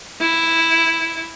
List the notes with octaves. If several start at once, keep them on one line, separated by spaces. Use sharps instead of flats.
E4